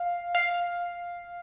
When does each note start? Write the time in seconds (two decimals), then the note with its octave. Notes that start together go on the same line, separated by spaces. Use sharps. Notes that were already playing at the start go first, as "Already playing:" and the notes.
Already playing: F5
0.35 F5